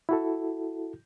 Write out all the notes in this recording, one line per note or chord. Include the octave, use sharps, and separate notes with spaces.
E4 F#4 A4